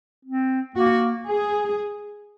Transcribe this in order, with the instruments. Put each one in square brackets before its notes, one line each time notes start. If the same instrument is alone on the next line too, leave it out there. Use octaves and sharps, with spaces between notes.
[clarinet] C4
[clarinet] A#3 [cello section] F#4
[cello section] G#4